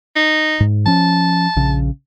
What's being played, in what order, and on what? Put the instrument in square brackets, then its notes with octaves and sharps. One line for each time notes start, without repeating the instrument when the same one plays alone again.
[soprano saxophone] D#4
[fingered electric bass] G#2
[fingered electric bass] F3 C#4 [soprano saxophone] A5
[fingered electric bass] A#1 C#3